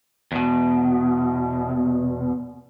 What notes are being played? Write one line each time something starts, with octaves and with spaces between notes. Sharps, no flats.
E2 B2